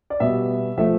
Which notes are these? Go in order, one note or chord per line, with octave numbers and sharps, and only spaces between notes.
D5
B2 G3 B3 E5
F3 A3 E5